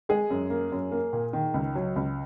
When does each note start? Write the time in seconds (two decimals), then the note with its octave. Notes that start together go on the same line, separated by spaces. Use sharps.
0.09 G#3 G#4
0.30 F#2
0.50 A#3
0.72 F#2
0.92 A#3
1.13 A#2
1.33 D#3
1.54 C#2
1.75 F#3
1.96 C#2